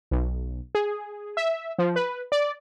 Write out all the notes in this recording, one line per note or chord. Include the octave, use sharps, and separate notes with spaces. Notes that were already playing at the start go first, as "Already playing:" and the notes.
B1
G#4
E5
F3
B4
D5